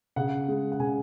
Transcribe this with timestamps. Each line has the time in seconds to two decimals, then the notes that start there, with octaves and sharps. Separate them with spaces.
0.16 C#3 F#5
0.48 G#3
0.72 F#5
0.79 C#3 G#5